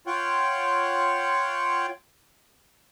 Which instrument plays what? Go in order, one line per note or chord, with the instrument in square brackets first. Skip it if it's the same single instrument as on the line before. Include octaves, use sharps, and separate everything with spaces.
[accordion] F4 C#5 F#5 G5